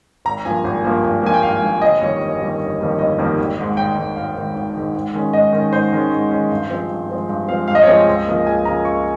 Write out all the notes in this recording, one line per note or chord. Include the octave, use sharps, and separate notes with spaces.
G#1 A#5
G2 F3 A#3 G#5
G#1
G2 F3 A#3
G#1
G2 F3 A#3 G#5
G5
G#1 F5
G2 F3 A#3
G1 D#5
F2 D#3 G3 A#3 C#5
G1
F2 D#3 G3 A#3
G1
F2 D#3 G3 A#3
G1 D#5
F2 D#3 G3 A#3
G#1
G#2 D#3
G#1 G5
G#2 D#3
G#1 F5
G#2 D#3
G#1
G#2 D#3
G#2
D#3 G#3 C#4
G#2 D#5
D#3 G#3 C#4
G#2 C5
D#3 G#3 C#4
G#2
D#3 G#3 C#4
G2
F3 G#3 C4
G2
F3 G#3 C4
G2
F3 G#3 C4 F5
G2 F5
D#5
C#5
F3 G#3 C4 D#5
C#2
C#3 F3 A#3
C#2 G#5
C#3 F3 A#3 A#5
C#2 C#6